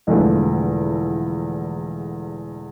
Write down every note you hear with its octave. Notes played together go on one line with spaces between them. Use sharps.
E1 E2 D3 F3 A3